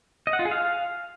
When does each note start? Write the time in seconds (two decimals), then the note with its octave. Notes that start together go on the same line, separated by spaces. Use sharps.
0.27 D#5
0.33 F#5
0.39 F4
0.45 G#4
0.51 F5